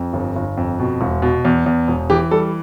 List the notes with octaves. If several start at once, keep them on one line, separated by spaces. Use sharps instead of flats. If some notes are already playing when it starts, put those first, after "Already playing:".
Already playing: F2
G1
G1
F2
B2
E1
B2
E2
E2
E1
E3 G4
G3 A4